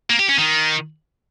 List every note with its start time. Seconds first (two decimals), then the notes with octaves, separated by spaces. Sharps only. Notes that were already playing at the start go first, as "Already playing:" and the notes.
0.10 A#3
0.19 G4
0.29 C#4
0.38 D#3